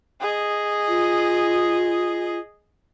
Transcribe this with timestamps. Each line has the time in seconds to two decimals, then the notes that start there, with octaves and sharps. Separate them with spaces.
0.21 G#4 D#5
0.88 F4